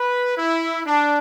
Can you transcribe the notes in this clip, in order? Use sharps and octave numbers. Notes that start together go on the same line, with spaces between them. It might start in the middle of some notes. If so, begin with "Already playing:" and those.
Already playing: B4
E4
D4